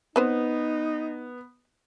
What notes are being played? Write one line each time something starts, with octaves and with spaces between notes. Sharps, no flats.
B3 C4 D#4 B4 C5